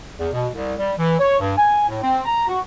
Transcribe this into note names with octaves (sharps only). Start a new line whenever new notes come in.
E2
B2
C2
G3
E3
C#5
G2
G#5
A2
C4
A#5
F#4